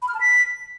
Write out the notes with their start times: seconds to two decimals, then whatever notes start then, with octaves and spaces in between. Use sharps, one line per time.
0.02 B5
0.08 F6
0.14 A5
0.20 B6